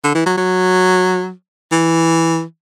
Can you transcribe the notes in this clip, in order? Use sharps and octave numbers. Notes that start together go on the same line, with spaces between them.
D3
E3
F#3
F#3
E3